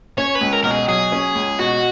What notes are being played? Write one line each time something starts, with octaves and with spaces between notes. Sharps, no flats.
C#4 C#5
B4
C#2
A#4
B2 A#4
G#4
F#3 G#4
C#4
C#2
B2 F#4